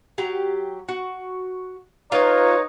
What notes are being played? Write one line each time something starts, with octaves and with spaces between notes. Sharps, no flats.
F#3 G4 A#5
F#4
D#4 F4 B4 C#5 A#5